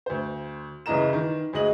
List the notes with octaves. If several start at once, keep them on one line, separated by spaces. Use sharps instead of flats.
D2 C5
C2 C#3 E3 D#5 A#5 E7
D#3 E3
D2 G#3 D#5 F#7